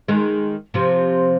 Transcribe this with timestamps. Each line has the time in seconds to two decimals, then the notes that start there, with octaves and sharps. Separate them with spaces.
0.08 D#3 G#3
0.74 C3 F3